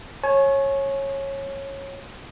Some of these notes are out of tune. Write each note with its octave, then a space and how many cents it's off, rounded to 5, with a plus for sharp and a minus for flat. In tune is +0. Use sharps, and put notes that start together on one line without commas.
C#5 -15 G#5 +30